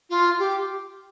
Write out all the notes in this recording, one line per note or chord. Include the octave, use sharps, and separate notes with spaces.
F4
G4